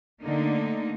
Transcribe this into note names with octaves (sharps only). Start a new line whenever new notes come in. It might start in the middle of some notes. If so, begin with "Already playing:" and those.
D3 A3 A#3 D#4